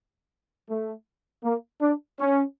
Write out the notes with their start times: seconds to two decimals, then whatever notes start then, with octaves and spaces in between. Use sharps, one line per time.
0.68 A3
1.43 A#3
1.80 D4
2.18 C#4